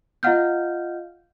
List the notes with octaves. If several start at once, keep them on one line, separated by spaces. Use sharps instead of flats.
F4 D#5 F5 F#5 F6 G6